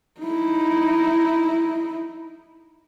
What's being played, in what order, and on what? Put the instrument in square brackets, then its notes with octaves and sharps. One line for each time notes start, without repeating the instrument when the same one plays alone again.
[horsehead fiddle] D#4 E4